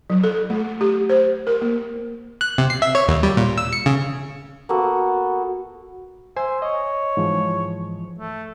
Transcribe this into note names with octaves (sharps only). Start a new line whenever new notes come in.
F#3
A4
A3
G4
C5
A#4
A#3
F#6
C3
C7
E5
C#5
D#2
G3
A#2
E6
C#7
C#3
A#3 B3 F#4 A4
C5 E5 G#5 C6
C#5 D#5
G#2 E3 F3
A3